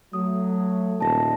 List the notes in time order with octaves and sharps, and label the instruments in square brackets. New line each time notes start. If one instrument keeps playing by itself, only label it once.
[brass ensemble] F#3 A3 [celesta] D#6
[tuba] D#1 [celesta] A5 A#6